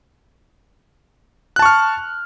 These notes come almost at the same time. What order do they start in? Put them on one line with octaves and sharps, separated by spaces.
F#6 A5 C#6 F6